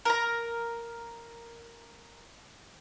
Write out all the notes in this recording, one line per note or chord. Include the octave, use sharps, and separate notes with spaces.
A#4 A#5